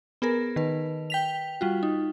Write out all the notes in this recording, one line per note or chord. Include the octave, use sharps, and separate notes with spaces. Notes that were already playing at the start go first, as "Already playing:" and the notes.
B3 G#4 A#4
D#3 B4
G5 B6 F7
G3 F4 F#4
D#4